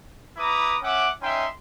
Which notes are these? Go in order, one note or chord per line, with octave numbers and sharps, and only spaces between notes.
E4 B4 A#5 D6 D#6
C#4 E5 F#5 D6
C#4 D#4 E5 G5 C6